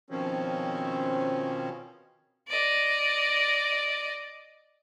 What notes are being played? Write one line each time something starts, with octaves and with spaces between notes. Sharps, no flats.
B2 D#3 F3 C4 C#4
D5 D#5